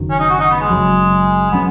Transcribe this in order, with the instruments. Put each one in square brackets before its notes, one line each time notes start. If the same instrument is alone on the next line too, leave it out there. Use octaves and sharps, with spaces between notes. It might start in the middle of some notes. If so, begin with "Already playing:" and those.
Already playing: [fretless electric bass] F#1 F#2 D#3 F#3
[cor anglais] C#4
D#4
F#4
D#4
B3
G#3
[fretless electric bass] F#1 F#2 F#3
[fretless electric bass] F#3 C#4 [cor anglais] B3